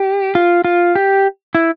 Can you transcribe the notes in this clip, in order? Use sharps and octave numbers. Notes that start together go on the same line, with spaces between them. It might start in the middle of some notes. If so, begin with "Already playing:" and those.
Already playing: G4
F4
F4
G4
E4